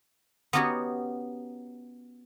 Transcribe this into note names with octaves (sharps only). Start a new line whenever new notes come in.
B3 C#4 D#4 F#4 G4 C#5